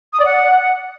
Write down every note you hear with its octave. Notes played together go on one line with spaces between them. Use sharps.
D#6
D5
F#5